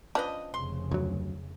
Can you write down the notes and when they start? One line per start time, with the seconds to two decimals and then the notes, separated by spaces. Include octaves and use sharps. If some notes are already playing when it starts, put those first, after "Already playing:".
0.15 F3 C#4 D4 B4 D#5
0.54 F1 C#3 C6
0.91 D2 F#3